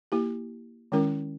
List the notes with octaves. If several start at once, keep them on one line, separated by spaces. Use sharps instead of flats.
A#3 E4 G4
D#3 G#3 C#4 E4 A#4